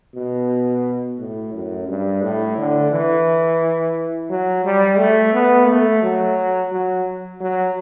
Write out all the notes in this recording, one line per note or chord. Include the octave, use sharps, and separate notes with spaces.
B2
A2
F#2
G2
A2
D3
E3
F#3
G3
A3
B3
A3
F#3
F#3
F#3